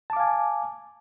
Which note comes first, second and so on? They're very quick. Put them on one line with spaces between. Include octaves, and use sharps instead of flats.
A5 D6 F5 G#5